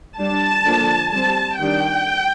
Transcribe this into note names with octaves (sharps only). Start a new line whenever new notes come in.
G3 D4 A5
D3 F3 A#3 D4
G3 C4 A5
D#3 G3 D4 G5